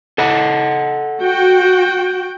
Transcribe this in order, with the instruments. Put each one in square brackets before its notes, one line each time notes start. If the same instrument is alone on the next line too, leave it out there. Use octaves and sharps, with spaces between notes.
[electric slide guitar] A4 D#5 F#5
[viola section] F#4 G5